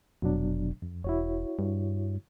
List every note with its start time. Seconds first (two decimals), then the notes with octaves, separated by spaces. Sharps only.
0.22 F1 B2 F#3 D4
0.82 F2
1.04 E1 E4 F#4 C#5
1.59 G2